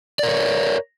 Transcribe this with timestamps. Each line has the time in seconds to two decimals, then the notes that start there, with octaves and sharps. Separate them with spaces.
0.19 D5
0.23 A#4
0.27 C#5